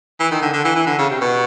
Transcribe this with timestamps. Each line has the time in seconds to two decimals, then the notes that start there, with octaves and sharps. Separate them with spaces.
0.20 E3
0.31 D#3
0.42 D3
0.53 D3
0.65 E3
0.75 E3
0.87 D3
0.99 C#3
1.10 C3
1.21 B2